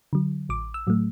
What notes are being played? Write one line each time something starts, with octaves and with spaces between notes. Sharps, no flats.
D3 F#3
A1 D6
E6
A2 F#3 A3